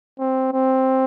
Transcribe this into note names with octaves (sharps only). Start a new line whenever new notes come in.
C4
C4